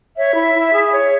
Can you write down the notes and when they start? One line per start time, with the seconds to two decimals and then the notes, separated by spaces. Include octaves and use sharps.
0.17 C#5 E5
0.35 E4
0.54 E4
0.73 G#4
0.92 C#5